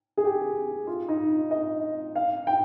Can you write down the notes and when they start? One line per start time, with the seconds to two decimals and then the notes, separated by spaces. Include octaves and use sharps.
0.17 G#4
0.25 G4
0.87 F4
1.08 D#4
1.51 D#5
2.16 F5
2.47 G5